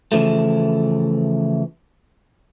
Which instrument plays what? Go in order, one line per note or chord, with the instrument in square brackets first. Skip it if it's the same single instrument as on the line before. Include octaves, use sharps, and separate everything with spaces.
[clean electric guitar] C#3 E3 F3 A3